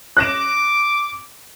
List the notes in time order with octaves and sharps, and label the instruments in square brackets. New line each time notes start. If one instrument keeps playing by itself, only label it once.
[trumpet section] D6 [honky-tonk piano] F#6 A#6 E7